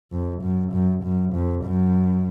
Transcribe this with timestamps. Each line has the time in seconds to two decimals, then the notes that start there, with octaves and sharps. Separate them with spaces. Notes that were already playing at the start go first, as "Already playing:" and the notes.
0.12 F2
0.42 F#2
0.73 F#2
1.03 F#2
1.34 F2
1.64 F#2